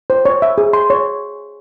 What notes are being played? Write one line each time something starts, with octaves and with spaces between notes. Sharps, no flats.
C5
C#5
E5
G#4
C6
C#5